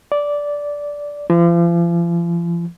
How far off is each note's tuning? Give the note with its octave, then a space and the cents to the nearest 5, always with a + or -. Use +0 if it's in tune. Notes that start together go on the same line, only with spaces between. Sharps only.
D5 -10
F3 -40